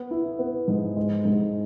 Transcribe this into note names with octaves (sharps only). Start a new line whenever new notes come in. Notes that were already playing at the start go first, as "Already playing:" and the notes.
Already playing: B3
E4
B3
G#2
G#3
G#2